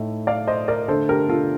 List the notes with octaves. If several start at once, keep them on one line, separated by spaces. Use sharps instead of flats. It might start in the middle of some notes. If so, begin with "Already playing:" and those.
Already playing: A2 A3 D#4
D5 F5
C5 D#5
A#4 D5
D3 A3 D4 A4 C5
G4 A#4
F4 A4